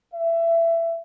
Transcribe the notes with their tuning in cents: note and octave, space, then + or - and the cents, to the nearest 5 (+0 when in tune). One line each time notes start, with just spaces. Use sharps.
E5 +20